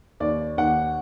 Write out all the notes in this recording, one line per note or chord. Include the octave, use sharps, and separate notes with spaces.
D#2 D5
D#2 F#5